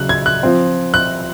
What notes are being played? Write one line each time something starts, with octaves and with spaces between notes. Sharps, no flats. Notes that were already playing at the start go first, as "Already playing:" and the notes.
Already playing: C#3 F#3 F#6
G#6
F#6
F3 C4
F#6